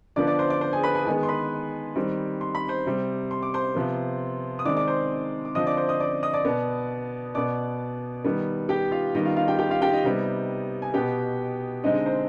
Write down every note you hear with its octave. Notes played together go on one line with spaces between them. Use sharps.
D3 F3 B3 D5 D6
D5 D6
C5 C6
D5 D6
C5 C6
G#4 G#5
B4 B5
G#4 G#5
D#3 G#3 B3 G#4 G#5
C6
B4 B5
D#3 G3 C4
C6
B5
C5 C6
C3 G3 C4
C6
D6
C5 C6
C3 F3 B3
D#6
D#3 G#3 C4 D5 D6
D5 D6
C5 C6
D6
D3 F3 C4 D#5 D#6
D5 D6
C5 C6
D#5 D#6
D5 D6
D#5 D#6
D5 D6
B2 B3
B2 B3 D5 D6
D#3 G3 B3
G4 G5
F4 F5
D#3 G3 B3 D#4 D#5
F4 F5
F4 F5
G4 G5
G4 G5
F4 F5
G4 G5
D#4 D#5
C3 G3 B3
G#5
B2 B3 G4 G5
D3 G#3 C4 D#4 D#5
D#4 D#5
C4 C5